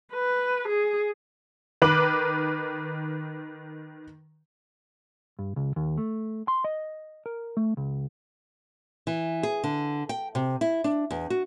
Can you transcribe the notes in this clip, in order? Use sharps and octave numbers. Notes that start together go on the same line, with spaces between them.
B4
G#4
D#3 B4 D6 F#7
G2
C#2
D#2
A3
C6
D#5
A#4
A3
C#2
E3
G#4
D3
G5
C3
E4
D4
E2
F#4